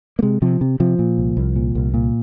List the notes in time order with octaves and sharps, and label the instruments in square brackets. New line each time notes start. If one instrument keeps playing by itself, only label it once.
[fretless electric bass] A#3
C3 G#3
C3 F3
C3
C3 F3
A#2
C2
C2
A#2
C2
A#2